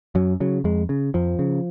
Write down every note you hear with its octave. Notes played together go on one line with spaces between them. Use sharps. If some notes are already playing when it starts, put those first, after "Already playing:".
F#2 F#3
C#3 F#3
F2 G#3
C#3
F2 F3
C#3